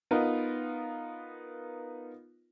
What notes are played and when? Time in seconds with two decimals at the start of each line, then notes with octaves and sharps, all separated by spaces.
0.11 B3 D#4 F4 A#4 B4